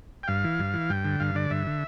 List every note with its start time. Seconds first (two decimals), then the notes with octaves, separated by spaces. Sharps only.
0.23 G5
0.28 G2 F5
0.44 E3
0.59 G2
0.74 E3
0.90 G2 G5
1.05 D3
1.20 G2 F5
1.35 D3 D5
1.50 G2 E5
1.67 D3